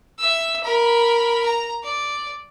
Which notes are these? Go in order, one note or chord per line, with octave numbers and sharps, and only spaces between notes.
E5 E6
A#4 B5
A#5
D5